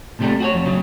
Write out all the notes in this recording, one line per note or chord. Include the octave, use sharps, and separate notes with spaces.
A2 C3 F3 G3 A3
F#4 G#4 C#5
F2
C#3 F#3